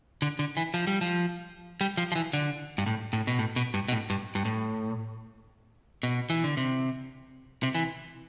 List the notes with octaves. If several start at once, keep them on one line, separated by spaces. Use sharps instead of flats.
D3
D3
E3
F3
G3
F3
G3
F3
F3
E3
D3
G2
A2
A2
B2
A2
B2
G2
B2
A2
G2
G2
A2
B2
E3
D3
C3
C3
E3